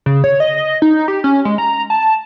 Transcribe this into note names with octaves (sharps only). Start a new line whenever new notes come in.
C#3
C#5
D#5
D#4
G4
C#4
G#3
A#5
A5